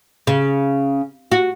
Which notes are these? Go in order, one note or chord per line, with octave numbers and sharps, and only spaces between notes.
C#3
F#4